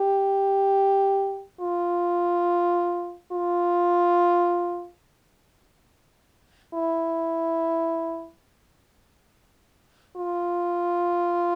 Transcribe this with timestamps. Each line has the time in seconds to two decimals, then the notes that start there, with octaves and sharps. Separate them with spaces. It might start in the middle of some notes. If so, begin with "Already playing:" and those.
Already playing: G4
1.61 F4
3.32 F4
6.74 E4
10.17 F4